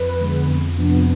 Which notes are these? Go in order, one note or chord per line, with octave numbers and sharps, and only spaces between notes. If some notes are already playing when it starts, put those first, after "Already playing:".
Already playing: F2 B4
D3 G#3 B3
F2
C3 F3 B3 D4